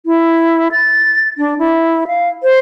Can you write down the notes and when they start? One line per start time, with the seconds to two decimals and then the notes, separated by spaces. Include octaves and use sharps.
0.06 E4
0.72 A6
1.38 D4
1.59 E4
2.07 F5
2.43 C5